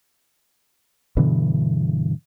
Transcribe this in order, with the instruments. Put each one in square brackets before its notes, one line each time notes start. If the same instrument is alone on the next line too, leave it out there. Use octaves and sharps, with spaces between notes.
[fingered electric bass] G2 B2 D3 E3